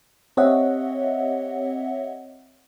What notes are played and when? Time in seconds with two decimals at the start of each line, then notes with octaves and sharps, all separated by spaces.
0.37 C4 G4 C#5 D#5 E5 F#5